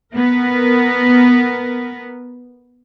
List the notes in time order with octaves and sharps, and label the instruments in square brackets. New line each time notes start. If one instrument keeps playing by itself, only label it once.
[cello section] B3 A#4